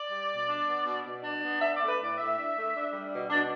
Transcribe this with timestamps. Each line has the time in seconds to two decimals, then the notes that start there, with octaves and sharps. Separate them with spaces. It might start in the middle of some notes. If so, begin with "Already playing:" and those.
Already playing: D5
0.11 G3
0.30 B2
0.48 D4
0.68 B3
0.86 B2
1.05 B2
1.23 D4
1.43 B3
1.60 D4 E5
1.75 A3 D5
1.89 B4
1.99 A2 D5
2.18 A2 E5
2.37 D4
2.55 A3
2.74 D4
2.93 G3
3.12 B2
3.30 B2 D4